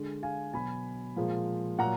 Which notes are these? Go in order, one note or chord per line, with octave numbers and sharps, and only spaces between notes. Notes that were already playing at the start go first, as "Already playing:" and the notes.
Already playing: D3 G#3
F5 G#5
B2 F#3 G#5 B5
A#2 F3 G#3
A#2 F#3 F#5 A#5